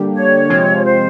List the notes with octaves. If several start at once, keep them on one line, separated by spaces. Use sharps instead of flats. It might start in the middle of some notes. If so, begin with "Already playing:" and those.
Already playing: D3 G3 A#3 D4 G4
C#5
C3 F3 G#3 C4 F4
C5